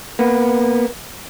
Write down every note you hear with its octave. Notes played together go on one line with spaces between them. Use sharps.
A#3 B3